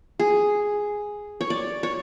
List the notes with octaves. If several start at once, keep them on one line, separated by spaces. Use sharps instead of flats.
G#4
C#5
D5
C#5